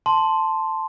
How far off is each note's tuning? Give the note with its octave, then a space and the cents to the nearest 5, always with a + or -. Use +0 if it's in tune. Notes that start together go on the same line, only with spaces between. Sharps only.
A5 +0 C6 +0